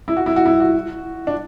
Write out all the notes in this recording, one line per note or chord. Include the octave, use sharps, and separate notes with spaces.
E4
F#4
E4
F#4
E4
F#4
D4